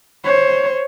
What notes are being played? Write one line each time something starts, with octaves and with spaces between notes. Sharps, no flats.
C5 C#5